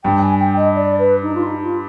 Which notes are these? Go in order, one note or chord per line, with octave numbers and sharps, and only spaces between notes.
G2 G5
G#5
G5
D#5
D5
B4
D#4
F4
D#4
F4